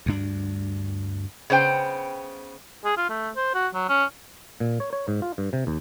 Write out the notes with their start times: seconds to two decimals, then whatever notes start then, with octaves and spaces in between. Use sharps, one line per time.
0.06 D2 G2 D4
1.50 C#3 B3 C5 G5
2.85 G#4
2.97 F4
3.09 A3
3.36 C5
3.55 F#4
3.74 F#3
3.89 C#4
4.60 A#2
4.80 C#5
4.93 C#5
5.08 G#2
5.22 F4
5.38 G2
5.53 C3
5.67 D#2